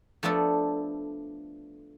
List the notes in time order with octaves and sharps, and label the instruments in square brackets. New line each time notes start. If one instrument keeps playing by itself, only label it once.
[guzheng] F3 A3 B3 D4 A4